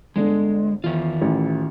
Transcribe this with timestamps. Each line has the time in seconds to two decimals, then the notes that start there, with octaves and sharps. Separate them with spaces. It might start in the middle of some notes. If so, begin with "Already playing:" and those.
0.16 G1 D3 G#3
0.84 E2 D#3 F4
1.22 A1